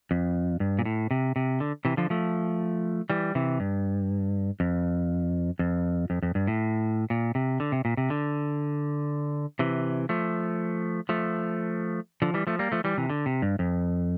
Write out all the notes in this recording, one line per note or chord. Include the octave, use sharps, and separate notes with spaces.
F2
G2
A#2
A2
C3
C3
D3
C3 E3
D3 F3
F3 A3
E3 G3
C3 E3
G2
F2
F2
F2
F2
G2
A2
A#2
C3
D3
C3
A#2
C3
D3
C3 E3
F3 A3
F3 A3
D3 F3
E3 G3
F3 A3
G3 A#3
F3 A3
E3 G3
C3 E3
D3
C3
G2
F2